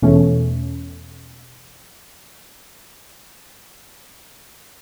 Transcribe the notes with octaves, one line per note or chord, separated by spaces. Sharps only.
E2 B2 A3 C#4